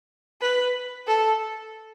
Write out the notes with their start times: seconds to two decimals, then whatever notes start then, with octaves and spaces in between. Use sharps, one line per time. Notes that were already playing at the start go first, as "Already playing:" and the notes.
0.41 B4
1.07 A4